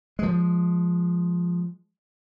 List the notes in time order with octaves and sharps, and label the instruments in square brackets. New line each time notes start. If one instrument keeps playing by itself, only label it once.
[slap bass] F3 G#3